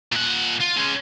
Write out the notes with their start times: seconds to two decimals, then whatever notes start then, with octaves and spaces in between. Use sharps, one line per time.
0.12 A#2 F#5
0.61 F4
0.77 G#3 C#4